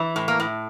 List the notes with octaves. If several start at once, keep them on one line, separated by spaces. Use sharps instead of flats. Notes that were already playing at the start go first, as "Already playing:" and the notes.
Already playing: E3
A2
A#3
A2